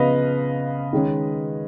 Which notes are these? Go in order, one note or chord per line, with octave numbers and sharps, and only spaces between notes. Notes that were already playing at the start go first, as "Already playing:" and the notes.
Already playing: C#3 F3 B3 B4 D#5 F5
D#3 G#3 C#4